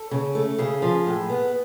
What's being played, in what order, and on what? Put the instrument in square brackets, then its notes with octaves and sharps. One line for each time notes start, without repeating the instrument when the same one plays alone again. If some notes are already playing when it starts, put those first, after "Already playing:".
Already playing: [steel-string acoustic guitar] A4
C#3
A3
C#3 G#4
F3
A2
B3